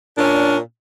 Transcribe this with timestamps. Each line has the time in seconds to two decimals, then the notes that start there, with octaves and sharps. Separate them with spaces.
0.15 D4
0.18 A#2
0.21 C#4